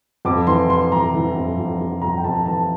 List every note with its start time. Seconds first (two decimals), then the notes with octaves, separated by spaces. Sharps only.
0.25 F2 D6
0.47 E3 C6
0.69 E3 C6
0.91 F2 A#5
1.14 E3
1.35 F2
1.57 F2
1.79 F2
2.02 F2 A#5
2.17 G5
2.24 F2 A5
2.46 E3 A5